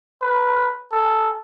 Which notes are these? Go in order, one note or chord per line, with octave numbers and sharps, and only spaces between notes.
B4
A4